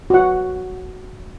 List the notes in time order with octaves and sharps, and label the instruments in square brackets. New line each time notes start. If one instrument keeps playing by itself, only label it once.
[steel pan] F#4 F#5